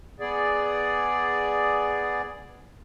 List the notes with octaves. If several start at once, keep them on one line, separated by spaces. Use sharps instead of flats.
B3 G#4 D5